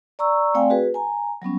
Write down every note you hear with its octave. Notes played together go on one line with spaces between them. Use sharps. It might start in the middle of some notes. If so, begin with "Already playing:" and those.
D5 A#5 C#6 E6
A3 C4 D5 F5 G5 G#5
F#4 G#4 B4
G#5 A#5
F#3 G3 B3 C#4